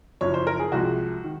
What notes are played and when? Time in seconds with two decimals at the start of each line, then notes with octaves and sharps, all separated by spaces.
0.21 F#1 F#2 F3 C#5
0.34 C5
0.47 A#4
0.59 G#4
0.72 C2 C3 F3 G#3 F#4
1.24 D#3